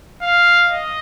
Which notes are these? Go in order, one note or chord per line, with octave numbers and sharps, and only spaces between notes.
F5
D#5